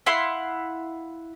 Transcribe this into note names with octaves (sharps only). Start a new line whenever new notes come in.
E4 F5 F#5 C6